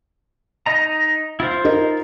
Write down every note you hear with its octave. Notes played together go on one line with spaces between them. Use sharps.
D#4 D#5 A#5
E4 F4 C5
D#4 A#4 D#5